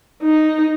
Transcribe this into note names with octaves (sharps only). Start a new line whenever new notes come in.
D#4